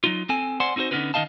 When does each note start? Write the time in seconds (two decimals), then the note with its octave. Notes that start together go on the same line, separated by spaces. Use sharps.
0.04 F#3 D#4 F4
0.29 C4 A4 G#5
0.60 C5 D5 F#5 G#5 C6
0.76 C4 D#4 F#4 A4 C5
0.91 D3 B3 C#4 D#4 F4 B4
1.14 D#3 A3 D#4 D#5 F5 A5